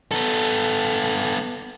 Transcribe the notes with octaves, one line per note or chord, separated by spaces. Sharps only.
B3 A4